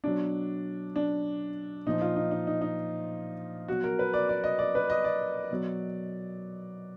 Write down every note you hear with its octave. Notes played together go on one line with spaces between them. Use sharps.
B2 F#3 D4
D4
A#2 F3 D#4
F4
D#4
D#4
D#4
D#4
B2 F#3 F#4
A#4
B4
D5
D5
D#5
D5
B4
D#5
D5
B2 F#3